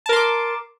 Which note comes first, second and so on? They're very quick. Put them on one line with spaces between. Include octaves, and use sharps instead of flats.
A5 A#4 C6 D6